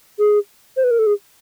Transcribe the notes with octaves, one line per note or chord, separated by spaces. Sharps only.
G#4
C5
B4
A#4
A4
G#4